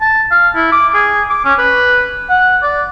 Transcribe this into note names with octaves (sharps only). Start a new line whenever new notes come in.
A5
F5
E4
D6
G#4
D6
C#4
B4
F#5
D5